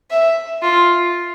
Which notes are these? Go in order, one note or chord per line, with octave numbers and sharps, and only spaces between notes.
E5
F4